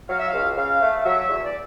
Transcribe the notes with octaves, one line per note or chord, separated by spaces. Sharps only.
F#3 F5
E5
C#2 F5
C#3 F5
A3
F#3 E5
E2
D5